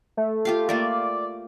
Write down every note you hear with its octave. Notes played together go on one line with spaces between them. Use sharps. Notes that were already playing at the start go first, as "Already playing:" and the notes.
A3
F4 G4 F5
A3 A#3 F4 D5